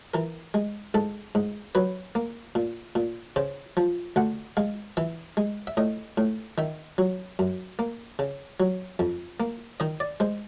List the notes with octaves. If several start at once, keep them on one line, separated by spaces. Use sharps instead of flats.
E3 A#4
G#3
G#2 A4
G#2
F#3 B4
A#3
A#2
A#2
C#3 C5
F3
D2 F#5
G#3 F5
E3 E5
G#3
E5
A2 D#5
A2
D#3 E5
F#3
F#2
A#3
C#3
F#3
F2
A#3
D#3 D#5
D5
G#3 C5